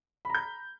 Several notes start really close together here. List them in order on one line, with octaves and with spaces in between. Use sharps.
B5 A#5 G6